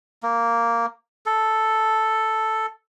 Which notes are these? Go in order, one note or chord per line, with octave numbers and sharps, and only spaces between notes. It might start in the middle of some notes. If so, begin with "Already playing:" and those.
A#3
A4